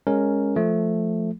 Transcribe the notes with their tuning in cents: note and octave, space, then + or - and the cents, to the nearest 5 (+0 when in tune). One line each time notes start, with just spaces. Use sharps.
G#3 -10 C#4 +0 A#4 +0
F3 +0 A3 +0